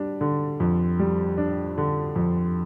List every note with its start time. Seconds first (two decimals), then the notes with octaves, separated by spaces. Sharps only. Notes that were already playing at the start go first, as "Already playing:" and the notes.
Already playing: G3 D4
0.21 D3
0.60 F2
0.99 G3
1.38 D4
1.78 D3
2.16 F2